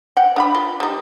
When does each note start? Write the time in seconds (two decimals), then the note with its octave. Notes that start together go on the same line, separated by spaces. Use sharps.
0.17 F#5 G5
0.36 D4 F5 B5
0.55 F4
0.80 G3 D#4